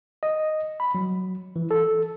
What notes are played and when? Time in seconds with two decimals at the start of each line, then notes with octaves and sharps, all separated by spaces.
0.23 D#5
0.80 B5
0.95 F#3
1.56 E3
1.71 A4